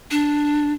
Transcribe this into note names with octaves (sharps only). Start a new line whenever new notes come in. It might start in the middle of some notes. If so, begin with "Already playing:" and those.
D4